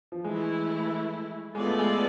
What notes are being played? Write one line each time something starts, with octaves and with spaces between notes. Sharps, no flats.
F3
E3 G#3 A3 E4
G#3 B3 F4 A4 D5
A3
G#3